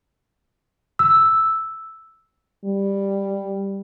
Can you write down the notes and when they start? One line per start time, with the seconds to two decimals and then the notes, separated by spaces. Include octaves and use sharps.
0.99 E6
2.65 G3